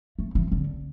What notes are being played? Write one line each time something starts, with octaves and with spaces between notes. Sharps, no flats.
A3
E3
D3